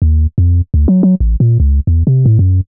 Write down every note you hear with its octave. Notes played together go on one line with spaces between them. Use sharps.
D#2
F2
D2
F#3
F#3
A1
A#2
C#2
E2
C3
A2
F#2